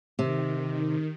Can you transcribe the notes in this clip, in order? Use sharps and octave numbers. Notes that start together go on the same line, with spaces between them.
C3 D#3